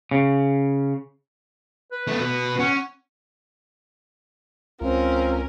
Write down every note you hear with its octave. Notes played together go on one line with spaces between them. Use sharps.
C#3
B4
A3 B3
B2 B3 B4
C#4 F#5
C#2 C4 C#4 F4 A#4